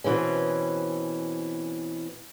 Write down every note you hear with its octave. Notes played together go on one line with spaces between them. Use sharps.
B2 E3 C4 C#4